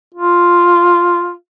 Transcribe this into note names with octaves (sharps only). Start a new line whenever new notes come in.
F4